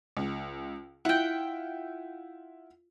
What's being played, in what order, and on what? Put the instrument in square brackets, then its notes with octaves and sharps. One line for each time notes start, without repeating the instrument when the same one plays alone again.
[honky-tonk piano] C#2
[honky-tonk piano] E4 F4 [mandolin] F#5 G5